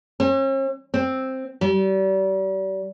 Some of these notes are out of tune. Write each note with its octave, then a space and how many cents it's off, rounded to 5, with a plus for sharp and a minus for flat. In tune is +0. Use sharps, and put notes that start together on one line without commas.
C#4 -45
C4 +5
G3 -35